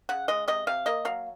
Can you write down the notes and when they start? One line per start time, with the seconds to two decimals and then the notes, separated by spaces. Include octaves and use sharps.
0.09 C#3 F#5
0.28 G#3 D#5
0.48 C3 D#5
0.67 C3 F5
0.86 A#3 D#5
1.05 F#3 F5